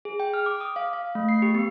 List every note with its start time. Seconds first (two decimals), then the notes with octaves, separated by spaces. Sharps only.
0.05 G#4
0.20 G5
0.34 F6
0.46 D6
0.61 D#6
0.76 F5
0.93 F5
1.15 A3
1.29 C7
1.42 G4
1.55 B3